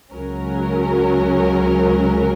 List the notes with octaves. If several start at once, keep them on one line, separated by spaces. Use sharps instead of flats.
C#2 C#3 F#3 C#4 A#4